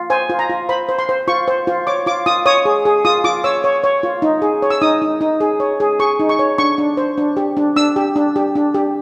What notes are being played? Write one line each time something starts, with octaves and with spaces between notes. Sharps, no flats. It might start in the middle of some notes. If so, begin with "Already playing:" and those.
Already playing: F4
C5 G#5
F4
A#5
F4
C5 B5
C5
C6
C5
F4 C#6
C5
F4
C#5 D6
F4 D6
F4 D#6
C#5 D#6
G#4
G#4
F4 D#6
F4 D6
C#5 E6
C#5
C#5
F4
D#4
G#4
C#5
E6
D#4 D#6
D#4
D#4
G#4
C#5
G#4
G#4 C#6
D#4
C#6
C#5
D4 C#6
D4
C5
D4
G4
D4
D4 E6
G4
D4
G4
D4
G4